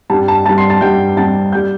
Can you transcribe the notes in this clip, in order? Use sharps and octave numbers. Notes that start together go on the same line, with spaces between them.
G2 G3 A5
A5
G2 G3 A5 A6
C6 C7
A5 A6
G2 G3 G5 G6
G2 G3 A5 A6
G3 G5 G6